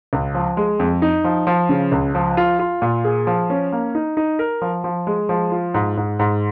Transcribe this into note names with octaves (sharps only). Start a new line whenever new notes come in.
C#2
F3
G#3
F2
D#4
F3
F3
C#3
C#2
F3
F4
F4
A#2
G#4
F3
C#4
A#3
D#4
D#4
A#4
F3
F3
G#3
F3
F4
G#2
G#2
G#2